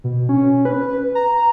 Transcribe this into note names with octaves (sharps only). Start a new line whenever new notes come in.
B2
C#4
B4
A#5